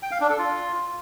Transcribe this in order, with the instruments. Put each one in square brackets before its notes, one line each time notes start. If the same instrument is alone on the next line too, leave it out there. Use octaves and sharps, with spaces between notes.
[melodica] G5
F5
D4
A4
F4